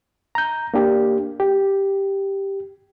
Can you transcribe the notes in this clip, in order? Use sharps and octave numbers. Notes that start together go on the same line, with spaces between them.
A#5 G6
A#3 D4 G4
G4